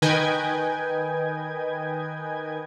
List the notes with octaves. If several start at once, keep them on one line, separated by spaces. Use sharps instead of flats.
D#3 B4 D#5 G5 G#5 G#6